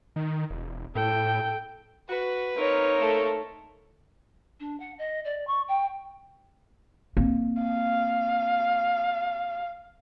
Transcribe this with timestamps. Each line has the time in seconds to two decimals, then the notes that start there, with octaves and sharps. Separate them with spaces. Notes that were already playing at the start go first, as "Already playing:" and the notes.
0.16 D#3
0.50 E1
0.95 A2 A4 G5
2.10 F#4 B4
2.57 A#3 C4 D#4 A#4 C#5
2.99 A3 A4
4.60 D4
4.80 F#5
4.99 D#5
5.25 D5
5.47 C#6
5.68 G5
7.17 A#3 C4
7.63 F5